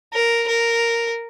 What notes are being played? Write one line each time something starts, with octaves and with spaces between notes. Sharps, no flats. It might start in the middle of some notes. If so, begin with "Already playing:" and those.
A#4
A#4